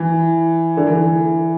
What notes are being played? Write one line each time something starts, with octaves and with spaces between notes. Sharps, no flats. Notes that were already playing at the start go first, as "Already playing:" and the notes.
Already playing: E3
D3
E3